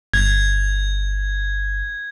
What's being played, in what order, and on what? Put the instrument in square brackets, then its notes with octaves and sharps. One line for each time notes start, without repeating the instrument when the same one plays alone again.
[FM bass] G1 [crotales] G#6